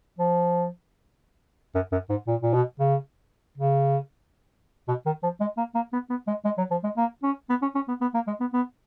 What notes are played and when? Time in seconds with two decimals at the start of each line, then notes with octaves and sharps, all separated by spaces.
0.19 F3
1.75 F#2
1.92 F#2
2.10 G#2
2.27 A#2
2.42 A#2
2.54 B2
2.80 C#3
3.58 C#3
4.88 B2
5.06 D#3
5.23 F3
5.41 G#3
5.58 A#3
5.75 A#3
5.93 B3
6.10 B3
6.28 G#3
6.45 G#3
6.58 F#3
6.71 F3
6.84 G#3
6.97 A#3
7.23 C#4
7.50 B3
7.62 C#4
7.75 C#4
7.89 B3
8.01 B3
8.14 A#3
8.27 G#3
8.40 B3
8.54 B3